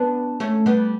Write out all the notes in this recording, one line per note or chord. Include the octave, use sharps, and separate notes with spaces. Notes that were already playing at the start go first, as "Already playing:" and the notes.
Already playing: B3 D4
A3 C#4
G3 B3